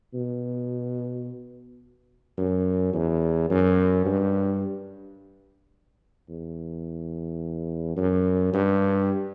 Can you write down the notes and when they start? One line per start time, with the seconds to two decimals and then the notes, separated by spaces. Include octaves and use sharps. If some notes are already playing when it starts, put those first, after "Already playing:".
0.14 B2
2.38 F#2
2.93 E2
3.50 F#2
4.06 G2
6.29 E2
7.97 F#2
8.53 G2